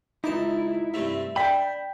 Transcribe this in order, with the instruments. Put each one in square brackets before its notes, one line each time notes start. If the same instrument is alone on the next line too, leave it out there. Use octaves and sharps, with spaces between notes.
[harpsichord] C#2 A5 D6 [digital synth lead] D#4 [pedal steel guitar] E4
[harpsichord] G2 C3 A3 [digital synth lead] E5
[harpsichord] D4 [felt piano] G5 B6 [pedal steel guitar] B5 G6